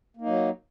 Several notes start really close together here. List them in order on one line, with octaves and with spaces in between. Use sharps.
A#3 D#4 F#3